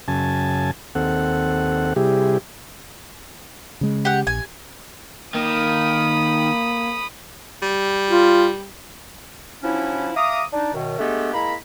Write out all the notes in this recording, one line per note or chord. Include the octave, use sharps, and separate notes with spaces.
F#2 C#3 G#5 A5
D#2 C4 A4 F#5
C3 G3 E4 G4 G#4
C#3 G#3
G4 F#5
A#1 G#5
D#3 A#3 B5 D#6
G3
F4
F3 F#3 C#4 D4 E4
E5 F5 A#5 D6 D#6
D4 D#4
F#2 B2 D#3
G#3 A3 B3 D4 G4 A4
G#3 A#3 E4 A#5 B5